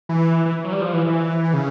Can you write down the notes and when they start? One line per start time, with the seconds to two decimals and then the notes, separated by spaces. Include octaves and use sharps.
0.09 E3
0.46 E3
0.64 F#3
0.72 G3
0.81 F3
0.93 E3
1.06 E3
1.53 C#3